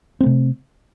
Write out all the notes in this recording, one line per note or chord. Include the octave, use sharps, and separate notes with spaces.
C3 A3 C4